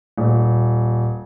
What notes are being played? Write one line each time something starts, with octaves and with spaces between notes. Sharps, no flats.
D#1